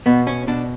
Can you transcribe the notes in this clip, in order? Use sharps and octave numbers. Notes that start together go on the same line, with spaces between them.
B2 B3
C#4
B2 D4